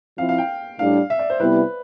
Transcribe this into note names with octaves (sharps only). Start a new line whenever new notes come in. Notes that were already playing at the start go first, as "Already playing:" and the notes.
F3 C4 E4 F5
F5
G5
A2 G3 D4 F5
E5
D5
C5
C3 G3 B3 E4 B4